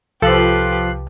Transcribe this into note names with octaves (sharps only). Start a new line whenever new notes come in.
C2 F3 G4 A4 B4 F#6 C7